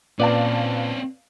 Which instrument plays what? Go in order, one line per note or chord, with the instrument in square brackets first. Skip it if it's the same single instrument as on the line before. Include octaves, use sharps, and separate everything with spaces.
[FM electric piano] A#2 [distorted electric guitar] C4 C#4 [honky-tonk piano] B4 F5 A5 [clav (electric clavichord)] D5